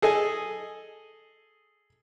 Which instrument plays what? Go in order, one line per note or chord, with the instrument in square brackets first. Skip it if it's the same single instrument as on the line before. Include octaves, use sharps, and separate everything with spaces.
[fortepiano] G#4 A4 D#5 G#5